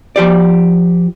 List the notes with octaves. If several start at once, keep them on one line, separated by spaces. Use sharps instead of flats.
F3 G4 D5